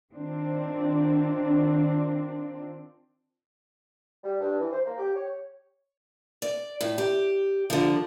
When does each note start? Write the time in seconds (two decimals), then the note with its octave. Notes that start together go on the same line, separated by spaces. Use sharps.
0.14 D#3 C4 D4 F4
4.23 G3
4.40 G2
4.59 E3
4.72 C5
4.86 A#3
4.98 G4
5.16 C#5
6.42 D5
6.81 A2
6.98 G4
7.70 D3 F3